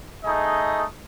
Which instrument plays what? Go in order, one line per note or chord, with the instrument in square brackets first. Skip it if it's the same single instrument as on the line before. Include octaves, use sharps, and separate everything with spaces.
[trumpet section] A3 D#4 G#4 D#5